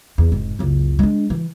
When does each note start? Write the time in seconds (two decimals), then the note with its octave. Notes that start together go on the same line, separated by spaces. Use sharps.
0.18 E2
0.32 F1 G#2
0.59 F#1 C#2
0.99 G#3 D4
1.30 E3